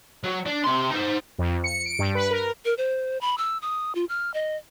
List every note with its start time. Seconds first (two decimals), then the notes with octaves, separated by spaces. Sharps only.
0.24 F#3
0.46 D4
0.64 C3 C6
0.90 D#4 C5
1.38 F2
1.64 C#7
1.86 D7
1.99 G2
2.15 B4
2.30 A#4
2.65 A#4
2.78 C5
3.21 B5
3.38 E6
3.62 D#6
3.95 F4
4.09 F6
4.34 D#5